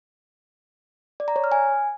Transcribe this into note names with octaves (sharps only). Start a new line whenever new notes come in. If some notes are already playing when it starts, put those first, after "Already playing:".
D5
A#5
C#5
F6
G#5